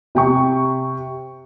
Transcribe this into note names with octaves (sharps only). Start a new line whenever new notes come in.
C3 G5 C#6